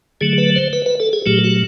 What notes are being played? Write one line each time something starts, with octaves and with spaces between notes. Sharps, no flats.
D3 F#3 A3 G#4
B4
C5
B4
B4
A4
G#4
A#2 F#3 A3 G4
F#4